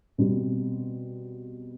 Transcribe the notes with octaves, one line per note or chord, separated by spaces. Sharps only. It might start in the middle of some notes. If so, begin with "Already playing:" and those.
B2 G3 C4